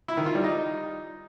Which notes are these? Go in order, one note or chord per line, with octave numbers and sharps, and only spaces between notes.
E4
D#3
F4
G3
D#4